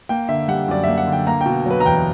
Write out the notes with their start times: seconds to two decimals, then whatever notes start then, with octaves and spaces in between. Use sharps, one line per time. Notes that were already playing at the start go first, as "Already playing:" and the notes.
0.09 A#3 G5
0.29 D3 E5
0.48 G3 F#5
0.68 F#2 D5
0.83 A#3 E5
0.98 F#5
1.07 D3
1.13 G5
1.27 A#3 A#5
1.41 B2 G5
1.66 F#3 B4
1.80 A#5
1.86 E2 G5